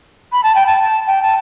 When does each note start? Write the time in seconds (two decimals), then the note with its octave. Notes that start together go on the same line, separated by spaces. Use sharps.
0.32 B5
0.44 A5
0.55 G5
0.67 A5
0.82 A5
1.07 G5
1.22 A5